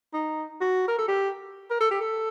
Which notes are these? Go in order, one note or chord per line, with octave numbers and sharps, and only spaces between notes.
D#4
F#4
A#4
A4
G4
A#4
A4
G4
A4